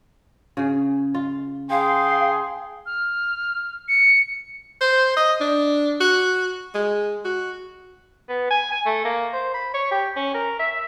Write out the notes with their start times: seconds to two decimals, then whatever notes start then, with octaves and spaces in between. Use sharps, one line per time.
0.57 C#3 G#4
1.14 F4
1.70 G#4 F5 G5 C6
2.86 F6
3.88 C#7
4.81 C5
5.16 D#5
5.41 D4
6.01 F#4
6.75 G#3
7.25 F#4
8.29 B3
8.51 G#5
8.72 G#5
8.86 A3
9.05 A#3
9.33 C5
9.54 B5
9.74 C#5
9.91 G4
10.16 C#4
10.34 A#4
10.59 E5